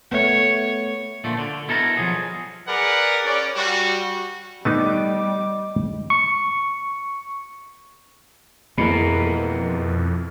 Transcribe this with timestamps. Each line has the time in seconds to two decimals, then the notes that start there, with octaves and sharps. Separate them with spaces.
0.12 A3 B3 C#5
1.24 A#2 D3 F3 A3
1.39 D3
1.68 B2 E4 A4 A#4 A#5
1.97 F3 F#3 G#4
2.67 G#4 A#4 B4 D5 F#5
3.25 C#4 D5
3.56 G3 F#4
4.65 G3 A3 B3 D#4 D#5 D6
6.10 C#6
8.78 F2 B2 E3 G#3 A#3 A#4 B5